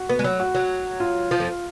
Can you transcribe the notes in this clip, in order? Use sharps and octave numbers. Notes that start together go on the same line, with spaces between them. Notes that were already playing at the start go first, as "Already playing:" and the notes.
Already playing: F#4
B3
G#3
F#3
F#4
F#3
F4
F3
F2